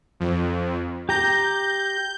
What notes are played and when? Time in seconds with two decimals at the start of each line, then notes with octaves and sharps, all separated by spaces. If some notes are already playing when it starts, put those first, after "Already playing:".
0.20 F2
1.09 G4 A#5 G6